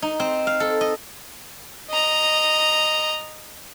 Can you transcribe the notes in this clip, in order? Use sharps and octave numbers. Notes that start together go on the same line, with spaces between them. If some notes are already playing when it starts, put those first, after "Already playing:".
D#4
C4
F5
A4
D#5
D#5 A#5